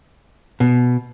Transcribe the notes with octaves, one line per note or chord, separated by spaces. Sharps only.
B2